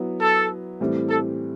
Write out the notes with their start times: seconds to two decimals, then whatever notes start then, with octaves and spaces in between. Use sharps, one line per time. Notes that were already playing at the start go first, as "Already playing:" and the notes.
Already playing: F#3 B3 E4
0.21 A4
0.80 A2 E3 G3 C4
1.09 A4